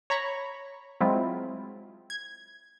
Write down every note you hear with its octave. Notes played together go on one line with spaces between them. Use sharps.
C#5 A#5 B5 C#6
F#3 G#3 C4 E4 F4
G#6